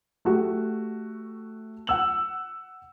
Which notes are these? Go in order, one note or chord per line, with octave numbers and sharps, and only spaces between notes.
A3 F#4 G4
F#5 E6 F#7